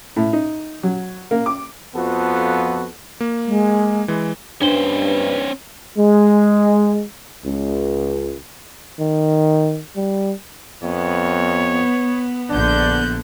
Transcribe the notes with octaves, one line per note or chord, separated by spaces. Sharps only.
A2
D#4
F#3
A#3
D6
F2 F3 B3 F#4 A4
A#3
G#3
E3 G#3
G2 C#4 D4 B4 C5 G7
G#3
C#2
D#3
G3
F2 B3 C#5
A#1 D3 D4 F#6 G6